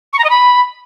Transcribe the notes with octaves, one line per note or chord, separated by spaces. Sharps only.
C#6
A#5
D#5
B5